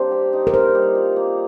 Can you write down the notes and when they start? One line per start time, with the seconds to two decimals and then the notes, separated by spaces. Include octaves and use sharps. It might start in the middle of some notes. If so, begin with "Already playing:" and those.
Already playing: G3 A#3 C4 D4 C5
0.11 G4
0.33 D#4
0.47 A#4
0.54 C4 C5
0.75 G3
0.95 F4
1.16 A#3